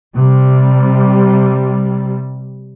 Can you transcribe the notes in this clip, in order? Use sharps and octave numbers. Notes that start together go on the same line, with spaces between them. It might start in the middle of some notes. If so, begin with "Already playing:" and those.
C3 G3